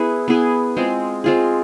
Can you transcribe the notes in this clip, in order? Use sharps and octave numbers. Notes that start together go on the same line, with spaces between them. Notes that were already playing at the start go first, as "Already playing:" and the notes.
Already playing: B3 E4 G#4 B4
B3 E4 G#4 B4
G#3 C4 F4 G#4
G#3 C4 F4 G#4